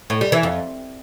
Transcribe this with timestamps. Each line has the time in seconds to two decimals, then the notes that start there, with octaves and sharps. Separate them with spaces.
0.10 A2
0.21 G3
0.32 E3
0.43 F2